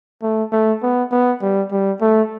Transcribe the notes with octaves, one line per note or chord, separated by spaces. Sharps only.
A3
A3
B3
B3
G3
G3
A3